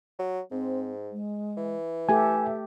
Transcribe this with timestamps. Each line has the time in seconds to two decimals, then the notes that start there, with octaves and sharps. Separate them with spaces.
0.19 F#3
0.51 G#2 C4
1.12 G#3
1.57 E3
2.09 A3 G4 A4 E5 G#5